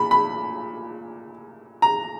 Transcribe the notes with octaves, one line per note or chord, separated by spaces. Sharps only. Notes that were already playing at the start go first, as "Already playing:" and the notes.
Already playing: A#2 B5
B5
A#5